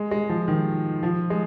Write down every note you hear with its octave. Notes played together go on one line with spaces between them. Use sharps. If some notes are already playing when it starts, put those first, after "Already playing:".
Already playing: G#3
G#3
F3
D#3
F3
G#3